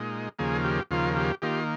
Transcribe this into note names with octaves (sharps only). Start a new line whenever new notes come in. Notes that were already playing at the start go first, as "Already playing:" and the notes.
Already playing: A#2 G#3 D#4
D#2 C#3 F3 A#3 G#4
G4
D#2 C#3 F3 A#3 F4
G4
D#3 A#3 F4 G4